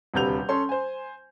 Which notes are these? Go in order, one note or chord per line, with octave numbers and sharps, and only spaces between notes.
D#1 D2 C3 B4 G6 F7
C#4 A4 C#5 C6
C5 G#5